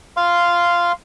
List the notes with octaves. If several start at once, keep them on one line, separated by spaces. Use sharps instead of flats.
F5 C6